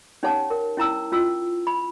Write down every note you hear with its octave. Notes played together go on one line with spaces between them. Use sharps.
C#4 D#4 G4 C#5 F#5 A5
A#4
C#4 E4 A#5 E6
C#4 F4 E6
B5